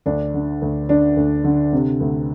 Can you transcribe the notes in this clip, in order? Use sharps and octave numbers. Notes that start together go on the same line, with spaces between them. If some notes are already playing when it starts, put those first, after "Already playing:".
D2 D4
D3
D2
D3 D4
D2
D3
C3
D2